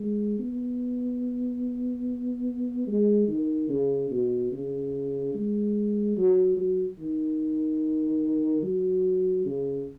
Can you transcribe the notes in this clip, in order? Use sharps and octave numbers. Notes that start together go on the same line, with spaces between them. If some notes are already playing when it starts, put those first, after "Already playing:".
Already playing: G#3
B3
G#3
D#3
C#3
B2
C#3
G#3
F#3
F#3
D#3
F#3
C#3